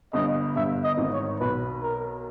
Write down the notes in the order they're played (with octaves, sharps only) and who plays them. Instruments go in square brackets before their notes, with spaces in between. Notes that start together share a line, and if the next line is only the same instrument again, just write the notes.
[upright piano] G1 G2 [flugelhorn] D#5
[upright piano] G1 G2 [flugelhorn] E5
[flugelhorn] D#5
[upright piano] G#1 G#2
[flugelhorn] C#5
[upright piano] B1 B2 [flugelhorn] B4
[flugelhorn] A#4